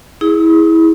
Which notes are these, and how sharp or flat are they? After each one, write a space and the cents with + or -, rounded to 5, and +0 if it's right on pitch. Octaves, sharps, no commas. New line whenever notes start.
E4 -20 G#4 -5 D#6 +35